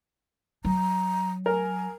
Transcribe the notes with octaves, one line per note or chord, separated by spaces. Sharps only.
F#3 A#5
A#4 G#5